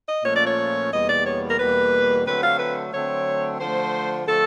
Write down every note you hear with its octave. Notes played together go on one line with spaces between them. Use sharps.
D#5
A#2 F3 A3 C#4 C#5
D5
C#5
E2 B2 G3 A#3 D#5
D5
C#5
A#4
E2 B2 G3 A#3 B4
D3 F#3 A3 C4 B4
F5
B4
D3 F#3 A3 C4 C#5
D3 F3 A3 C5
D3 F3 A3 A4